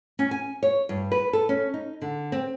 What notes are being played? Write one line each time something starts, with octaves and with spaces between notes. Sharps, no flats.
C#4
G#5
C#5
G2
B4
A4
C#4
D#4
D3
C4